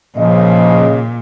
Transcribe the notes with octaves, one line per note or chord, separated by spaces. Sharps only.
A#2 C#3 F3 D#5